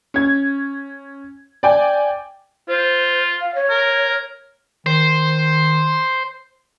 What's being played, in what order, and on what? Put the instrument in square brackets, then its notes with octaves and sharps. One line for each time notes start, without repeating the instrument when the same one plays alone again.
[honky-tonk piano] C#4 G#6
D5 G5 G#5
[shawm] F4 [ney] C5
[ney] F5
C#5
[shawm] A#4
[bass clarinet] D#3 [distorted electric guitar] C5